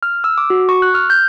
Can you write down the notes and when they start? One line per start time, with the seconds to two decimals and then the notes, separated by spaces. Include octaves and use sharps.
0.03 F6
0.24 E6
0.38 D6
0.50 F#4
0.69 C#6
0.82 F#6
0.94 F6
1.10 G6